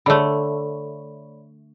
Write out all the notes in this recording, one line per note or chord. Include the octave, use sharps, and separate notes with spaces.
D3 A3 C#5 D5 B5